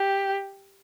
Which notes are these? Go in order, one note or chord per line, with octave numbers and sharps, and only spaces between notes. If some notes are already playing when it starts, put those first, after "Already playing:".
Already playing: G4